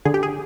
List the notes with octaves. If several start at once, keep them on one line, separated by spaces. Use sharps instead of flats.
D3 G#4
G4
G#4